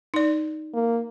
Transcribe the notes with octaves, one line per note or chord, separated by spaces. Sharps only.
D#4 D5
A#3